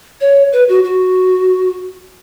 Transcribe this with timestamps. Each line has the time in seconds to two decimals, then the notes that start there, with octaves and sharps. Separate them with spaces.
0.21 C#5
0.53 B4
0.69 F#4
0.84 F#4